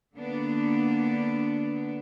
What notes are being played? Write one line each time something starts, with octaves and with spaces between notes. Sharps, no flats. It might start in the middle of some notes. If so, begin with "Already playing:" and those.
D3 A#3 B3 D4